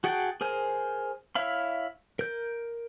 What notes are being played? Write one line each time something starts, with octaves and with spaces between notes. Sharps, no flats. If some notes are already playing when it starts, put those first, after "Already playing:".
F#4 G#4 F#5 G5 A5
G#4 A#4 C5 G#5
E4 C#5 E5 F5 B5
A#4 G6